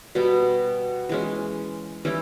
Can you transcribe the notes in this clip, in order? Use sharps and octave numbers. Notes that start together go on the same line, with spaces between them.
B2 G3 B3
E3 G#3 C#4
E3 G3 C#4 E4